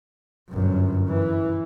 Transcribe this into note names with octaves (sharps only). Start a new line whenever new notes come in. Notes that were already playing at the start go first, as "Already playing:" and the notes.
G1 F#2
E3